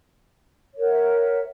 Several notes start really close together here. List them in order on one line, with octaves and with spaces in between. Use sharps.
C#5 A#4 F#5 E5